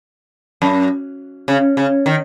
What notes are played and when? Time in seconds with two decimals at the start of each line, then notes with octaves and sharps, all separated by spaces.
0.62 F#2
1.48 C#3
1.77 C#3
2.06 D#3